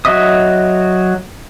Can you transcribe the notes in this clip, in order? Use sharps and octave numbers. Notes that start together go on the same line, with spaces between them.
F#3 F#4 D#5 E5 D#6